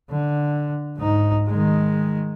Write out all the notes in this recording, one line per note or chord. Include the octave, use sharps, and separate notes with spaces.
D3
G#2 D#4
D#3 G#3